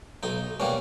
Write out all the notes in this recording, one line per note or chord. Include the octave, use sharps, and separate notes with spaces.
B1 D#4
B2 G3 A#3 C#4